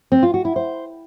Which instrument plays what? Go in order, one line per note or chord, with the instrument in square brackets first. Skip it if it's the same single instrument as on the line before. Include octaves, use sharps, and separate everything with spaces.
[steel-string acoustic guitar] C4
F4
F#4
E4
C5